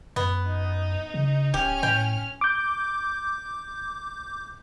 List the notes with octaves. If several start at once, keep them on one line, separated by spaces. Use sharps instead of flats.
F#2 B3
D#4
C#3
D1 C#4 G4 F6
A2 G5
D6 G6